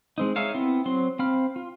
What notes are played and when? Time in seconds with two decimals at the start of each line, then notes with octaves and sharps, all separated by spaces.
0.18 G#3 C4 D#4
0.36 D#4 G#4 C#5 E5 F5
0.54 B3 C4 E4 C6
0.85 F#3 C4 C6
1.19 C4 F5 B5 F6
1.56 F4